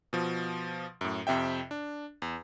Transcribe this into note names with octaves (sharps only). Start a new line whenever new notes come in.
B2 F3
F#2 A2
F2 C3 E5 G5
D4
E2